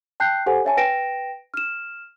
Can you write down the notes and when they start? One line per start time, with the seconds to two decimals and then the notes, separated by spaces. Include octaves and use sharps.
0.20 G5 A5 F#6 G6 C7
0.46 G4 A4 C5 F#5 G#5
0.65 C#5 E5 G#5 A5
0.77 B4 G5 A#6 D7 E7
1.54 F6 E7